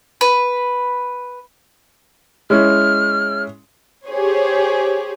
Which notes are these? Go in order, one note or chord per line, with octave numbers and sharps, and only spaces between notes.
B4
G#3 C#4 E4 F6
G4 G#4 C5 C#5